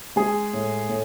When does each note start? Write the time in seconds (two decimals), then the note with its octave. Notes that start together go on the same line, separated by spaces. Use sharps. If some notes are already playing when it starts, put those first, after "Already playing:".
0.16 G#3 G#4
0.53 A2
0.89 A2